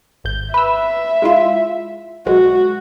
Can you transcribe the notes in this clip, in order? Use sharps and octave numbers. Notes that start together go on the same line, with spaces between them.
G#1 G6
B4 E5 E6
G#3 E4 F4
B1 G#3 F#4